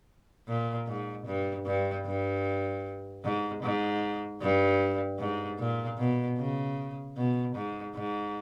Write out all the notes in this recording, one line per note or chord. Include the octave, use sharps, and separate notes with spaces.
A#2
G#2
G2
G2
G2
G#2
G#2
G2
G#2
A#2
B2
C#3
B2
G#2
G#2